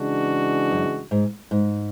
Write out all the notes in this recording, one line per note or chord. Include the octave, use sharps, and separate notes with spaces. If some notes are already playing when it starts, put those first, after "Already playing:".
Already playing: C#3 E3 G#3 D4 F#4
F#2
G#2
G#2